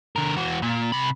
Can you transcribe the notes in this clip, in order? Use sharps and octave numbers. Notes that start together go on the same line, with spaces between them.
D3 A#4
E3 F#4
A#2
C3 B5